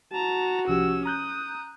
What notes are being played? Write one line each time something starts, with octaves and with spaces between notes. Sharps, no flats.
F#4 A5 A#5
C2 F3 C#4 G4 E6
A#5 D#6 F#6 G6